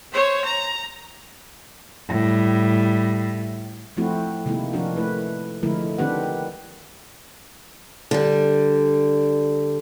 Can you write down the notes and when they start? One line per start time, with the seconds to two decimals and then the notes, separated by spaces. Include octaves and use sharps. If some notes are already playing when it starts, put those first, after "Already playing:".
0.13 C5 C#5
0.45 A#5
2.09 A2 G3
3.97 F3 A3 C4 E4 F#4
4.46 C3 D#3 G#3 A#3 E4
4.73 F3 C#4 D4 F#4 A#4
4.96 A3 E4 B4
5.63 D3 F3 G#3 A3 E4 A#4
5.98 D#3 C4 D4 G4 B4 F#5
8.11 D3 G3